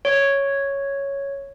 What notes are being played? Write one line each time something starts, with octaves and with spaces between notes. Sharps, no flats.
C#5